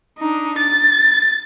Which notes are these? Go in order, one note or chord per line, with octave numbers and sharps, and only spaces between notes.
D4 D#4
A6